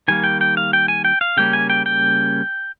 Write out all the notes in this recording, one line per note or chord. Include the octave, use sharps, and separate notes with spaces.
D#3 G3 A#3 G#5
G5
G5
F5
G5
G#5
G5
F5
C#3 G3 A#3 C#4 G5
G#5
G5
G5